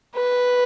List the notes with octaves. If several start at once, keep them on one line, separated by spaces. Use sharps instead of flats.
B4